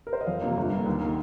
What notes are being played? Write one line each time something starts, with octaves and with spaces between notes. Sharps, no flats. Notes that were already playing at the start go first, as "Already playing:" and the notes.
A#4
C5
D#5
F2 F5
C3 F3 A#3
G1
G2 G3 A#3
D#2
D#3 A#3